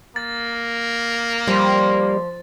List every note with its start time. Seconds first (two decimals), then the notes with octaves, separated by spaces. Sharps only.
0.16 A#3 A6
1.47 F3 G3